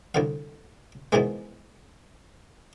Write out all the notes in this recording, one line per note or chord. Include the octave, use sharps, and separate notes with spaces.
C2 D3 F5
G#2 B2 D#3 E3 G#3